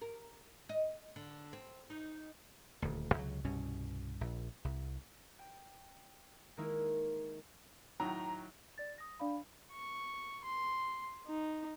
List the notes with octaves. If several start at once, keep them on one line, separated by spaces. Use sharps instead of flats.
A#4
D#5
D3
C4
D#4
D#1 D2
C#2 C3 F#3
C2 G2 B2 C#4
A#1
C2
G5
D#3 G#3 A#3 D#4 E4
A2 D#3 F#3 A#5
D5 A6
D#6 A#6
D4 D5 F5 B5
C#6
C6
D#4